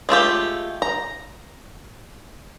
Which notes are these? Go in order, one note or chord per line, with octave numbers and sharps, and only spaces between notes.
G#3 A3 F4 G4
A#5